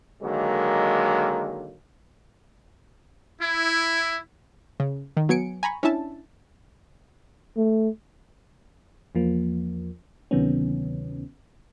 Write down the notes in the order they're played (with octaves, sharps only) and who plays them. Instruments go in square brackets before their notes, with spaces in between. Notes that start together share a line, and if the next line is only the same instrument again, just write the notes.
[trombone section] D3 D#3 F#3 G#3 A#3
[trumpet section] E4
[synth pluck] C#3
D#3
F#3 B3 G#5 C#7 D7
G#5 A#5 B5 C#6
C#4 D4 E4 E5 A5
[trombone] A3
[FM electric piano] E2 F3 A#3
D2 C3 D#3 F#3 B3 C#4